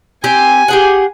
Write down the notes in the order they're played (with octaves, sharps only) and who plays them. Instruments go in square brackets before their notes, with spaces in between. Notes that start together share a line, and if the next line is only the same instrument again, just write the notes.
[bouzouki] C4 G4 [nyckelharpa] G#5
[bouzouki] G4 G#4 F#5